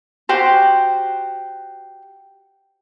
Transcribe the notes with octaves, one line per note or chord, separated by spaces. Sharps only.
F#4 G4 C5